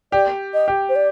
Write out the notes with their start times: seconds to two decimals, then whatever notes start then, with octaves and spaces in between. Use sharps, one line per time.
0.12 G4 D5
0.54 D#5
0.68 G4
0.89 C5
0.96 D5